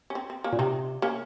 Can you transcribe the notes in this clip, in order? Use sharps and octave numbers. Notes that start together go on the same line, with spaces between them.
C#4
C4
C4
A#3 C#4
A#2
C3 C4 D#4
A#3 C#4